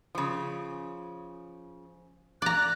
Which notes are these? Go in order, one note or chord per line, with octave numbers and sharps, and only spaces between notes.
C#3 F3
D5 A#5 F#6